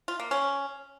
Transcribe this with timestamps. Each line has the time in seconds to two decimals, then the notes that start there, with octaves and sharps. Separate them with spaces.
0.08 F4
0.20 A#3
0.31 C#4